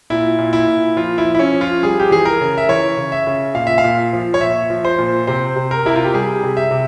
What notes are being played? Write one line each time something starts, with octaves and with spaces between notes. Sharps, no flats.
A#2 E4
A#2
E4
A#2
F3 F4
E4
F3
E4
C#4
F3
F4
G3 G#4
G4
E3 G#4
A#4
C#3
E5
E3 C#5
C#3
E5
C#3
A#2 F5
E5
F5
A#2
F3
C#5
A#2 E5
F3
C5
A#2
C3 C5
C3
A#4
C3 E4
F4
G4
G3 G#4
C3
E5
C3